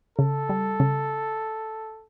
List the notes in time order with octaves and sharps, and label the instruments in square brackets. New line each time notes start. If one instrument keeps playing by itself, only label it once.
[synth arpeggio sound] C#3 [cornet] A4
[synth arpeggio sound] G3
C#3